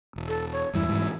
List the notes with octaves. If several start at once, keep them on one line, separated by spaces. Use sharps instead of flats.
E1
A4
C#5
E2 G2 E4
G#2 E3